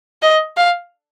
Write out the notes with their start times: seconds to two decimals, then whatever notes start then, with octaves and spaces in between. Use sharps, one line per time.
0.22 D#5
0.57 F5